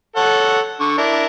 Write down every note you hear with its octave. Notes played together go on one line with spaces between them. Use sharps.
A4 C#5 F#5
D3 C#6
D4 E4 A#4